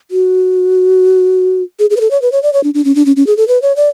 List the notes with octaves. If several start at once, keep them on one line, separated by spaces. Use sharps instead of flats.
F#4
G#4
G#4
B4
A4
C#5
B4
C#5
D5
C#5
D4
D4
C#4
D4
C#4
C#4
G#4
A4
B4
C#5
D5